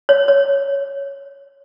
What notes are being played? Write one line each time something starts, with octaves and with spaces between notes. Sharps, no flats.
C#5
C#5